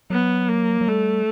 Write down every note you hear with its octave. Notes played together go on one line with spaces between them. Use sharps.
F#3 B3
A#3
F#3
G3 A3